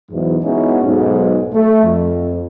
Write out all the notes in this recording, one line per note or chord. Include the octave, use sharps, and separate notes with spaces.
B1 E2 G#2
G#3 B3 C#4 D#4 E4 F#4
B1 G#2
A3
F2